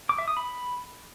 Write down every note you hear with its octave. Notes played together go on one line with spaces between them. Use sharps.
D6
E5
D#6
B5